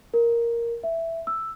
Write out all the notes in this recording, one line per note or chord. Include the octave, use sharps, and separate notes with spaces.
A#4
E5
E6